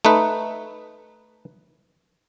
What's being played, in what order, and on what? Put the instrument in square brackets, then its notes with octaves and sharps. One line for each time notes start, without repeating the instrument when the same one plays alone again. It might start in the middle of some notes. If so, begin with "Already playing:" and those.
[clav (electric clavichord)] A3 D#4 B4